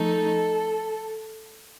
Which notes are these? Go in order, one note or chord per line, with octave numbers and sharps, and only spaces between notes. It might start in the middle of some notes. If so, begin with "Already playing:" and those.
Already playing: F3 A3 D#4 A4